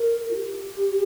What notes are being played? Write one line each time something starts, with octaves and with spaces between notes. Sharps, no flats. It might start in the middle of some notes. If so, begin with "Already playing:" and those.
Already playing: A#4
F4
G4